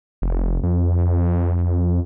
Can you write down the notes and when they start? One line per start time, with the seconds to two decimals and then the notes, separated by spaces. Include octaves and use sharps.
0.22 F1
0.63 F2